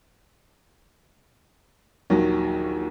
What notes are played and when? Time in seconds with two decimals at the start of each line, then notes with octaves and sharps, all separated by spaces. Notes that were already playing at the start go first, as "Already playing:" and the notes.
2.10 A#1 D#2 D#3 F#3